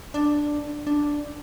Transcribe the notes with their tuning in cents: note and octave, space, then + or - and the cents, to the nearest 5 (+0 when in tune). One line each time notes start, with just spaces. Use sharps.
D4 +5
D4 +0